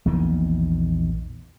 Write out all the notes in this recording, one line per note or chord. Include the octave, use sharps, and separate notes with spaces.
A#1 E2 A#2 D#3